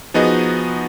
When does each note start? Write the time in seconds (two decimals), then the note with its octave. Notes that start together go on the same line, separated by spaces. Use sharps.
0.14 F3 B3 D#4 F#4 G#4 D#5